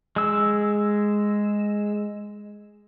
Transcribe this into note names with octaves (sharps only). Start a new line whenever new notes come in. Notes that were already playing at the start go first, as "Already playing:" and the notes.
G#3 E6